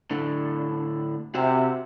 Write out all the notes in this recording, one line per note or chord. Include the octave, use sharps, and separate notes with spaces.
A2 D3 D4
C3 F#4 E5